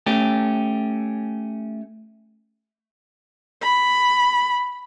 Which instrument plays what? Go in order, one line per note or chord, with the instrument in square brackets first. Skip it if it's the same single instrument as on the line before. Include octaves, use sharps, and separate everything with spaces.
[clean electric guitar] A3 C#4 G4
[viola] B5